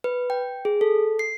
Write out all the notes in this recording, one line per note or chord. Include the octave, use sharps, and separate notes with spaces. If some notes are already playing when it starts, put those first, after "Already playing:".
B4
G5
G#4
A4
C7